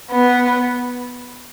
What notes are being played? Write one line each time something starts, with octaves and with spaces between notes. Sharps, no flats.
B3